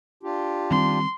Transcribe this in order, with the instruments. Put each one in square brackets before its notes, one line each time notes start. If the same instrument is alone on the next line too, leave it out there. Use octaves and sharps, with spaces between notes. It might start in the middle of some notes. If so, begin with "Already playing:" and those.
[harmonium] D4 F4 G4
[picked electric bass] D#3 G3 C4 [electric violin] C6